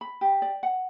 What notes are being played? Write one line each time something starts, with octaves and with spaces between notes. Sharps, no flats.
B5
G4
D5
F#5